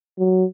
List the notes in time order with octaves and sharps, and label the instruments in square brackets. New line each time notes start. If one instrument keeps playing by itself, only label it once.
[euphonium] F#3